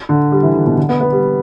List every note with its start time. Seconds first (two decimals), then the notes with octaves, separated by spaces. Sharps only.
0.09 D3
0.32 G3
0.43 E3
0.55 D3
0.66 B2
0.77 D3
0.89 B3
1.00 B3
1.12 G3